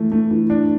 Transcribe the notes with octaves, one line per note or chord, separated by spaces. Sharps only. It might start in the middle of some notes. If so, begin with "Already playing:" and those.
Already playing: E3 A3
A3
E3
D4